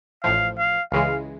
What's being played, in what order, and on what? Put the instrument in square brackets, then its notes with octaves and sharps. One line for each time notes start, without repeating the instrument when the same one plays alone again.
[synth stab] A1 A2 F3 [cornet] F5
[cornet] F5
[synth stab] C#2 C#3 E3 G#3 [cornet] F5